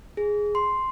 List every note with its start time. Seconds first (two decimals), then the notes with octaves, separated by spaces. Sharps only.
0.17 G#4
0.55 C6